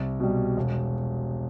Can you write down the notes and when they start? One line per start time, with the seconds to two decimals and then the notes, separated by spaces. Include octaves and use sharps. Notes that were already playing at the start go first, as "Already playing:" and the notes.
Already playing: C2
0.20 B2 G3
0.57 E1